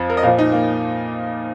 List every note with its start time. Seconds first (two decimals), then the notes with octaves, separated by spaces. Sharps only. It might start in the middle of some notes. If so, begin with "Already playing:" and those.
Already playing: F2 F3
0.10 A#4
0.17 D#5
0.23 A#2 F5
0.27 F3
0.39 D#4
0.52 A#3